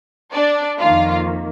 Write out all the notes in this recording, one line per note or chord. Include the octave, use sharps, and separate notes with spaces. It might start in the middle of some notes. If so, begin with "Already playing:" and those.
D4 D5
F2 D#3 A#3 F4 F5